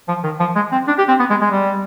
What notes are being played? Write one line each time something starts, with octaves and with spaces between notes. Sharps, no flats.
F3
D#3
F3
G#3
C4
D4
G4
C4
B3
G#3
G#3
G3